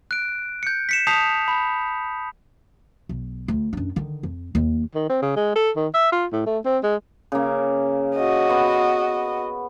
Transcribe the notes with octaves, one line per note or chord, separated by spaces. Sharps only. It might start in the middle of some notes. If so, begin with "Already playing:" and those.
F#6 D7
G6 C#7
B6 C#7 E7
A5 D#6 G6 B6 C7 F7
B5
B1
D2
F#2 D4
D3 D#3
F2
D#2
D#3
C4
C#3
G#3
A4
D#3
E5
F4
A2
A3
C4
G#3
C#3 A#3
F#4 D#5
B3 C#6